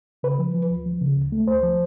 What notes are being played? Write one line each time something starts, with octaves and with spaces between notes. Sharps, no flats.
C#3 B4
F3
F3
D2
F3
C#3
D2
A3
D2 C5
F3